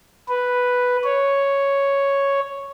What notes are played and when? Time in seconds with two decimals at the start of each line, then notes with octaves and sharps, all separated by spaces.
0.28 B4
1.04 C#5